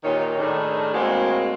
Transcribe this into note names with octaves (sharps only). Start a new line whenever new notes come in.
D#2 A#2 D#3 F4 C#5
A2 D#3 D4 G#4 A4
A2 G#3 A#3 C4 F#4 G#4